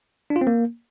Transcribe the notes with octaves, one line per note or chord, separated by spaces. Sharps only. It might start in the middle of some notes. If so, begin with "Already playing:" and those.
D4
F4
C4
A#3